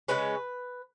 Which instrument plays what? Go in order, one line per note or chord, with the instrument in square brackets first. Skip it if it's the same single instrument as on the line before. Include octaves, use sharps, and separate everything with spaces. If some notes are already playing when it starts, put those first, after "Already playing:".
[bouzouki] C#3 G#3 C#4 B4